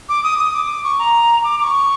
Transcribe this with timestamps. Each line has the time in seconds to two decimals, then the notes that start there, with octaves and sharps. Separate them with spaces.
0.09 D6
0.24 D#6
0.39 D#6
0.54 D6
0.84 C#6
0.99 A#5
1.44 D6
1.59 D6
1.64 C#6